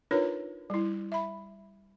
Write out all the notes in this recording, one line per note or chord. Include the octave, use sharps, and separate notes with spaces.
D4 D#4 F4 A#4 B4 C#5
G3 E4
E5 B5